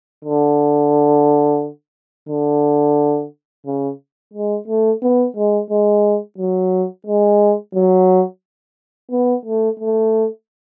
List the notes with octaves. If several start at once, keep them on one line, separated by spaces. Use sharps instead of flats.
D3
D3
C#3
G#3
A3
B3
G#3
G#3
F#3
G#3
F#3
B3
A3
A3